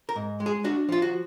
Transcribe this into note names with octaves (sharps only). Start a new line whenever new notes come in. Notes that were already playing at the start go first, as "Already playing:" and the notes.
A#4
G#2
G#3
G#4
D4 F#4
F3 F4
F#4